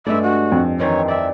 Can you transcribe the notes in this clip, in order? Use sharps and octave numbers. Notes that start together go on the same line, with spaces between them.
G2 G#3 A3 D5 E5
F#4
F2
D#3 E3 C4 C#5
D5 E5